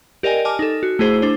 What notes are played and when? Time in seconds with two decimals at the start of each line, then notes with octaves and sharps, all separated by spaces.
0.23 G4 A#4 D5 D#5 G5 G#5
0.45 D#5 G#5 A5 D6 F6
0.59 D#4 A4
0.83 F#4
0.99 A3 E4 G#4 C5
1.22 D4 C5